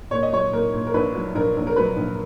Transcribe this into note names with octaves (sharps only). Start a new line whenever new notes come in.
A#2 C#5
D#5
F#3 C#5
A#2 A#4
A#2
A#4
A#1 B4
F#3
A#1 A#4
A#1
A#4
F#3 B4
A#1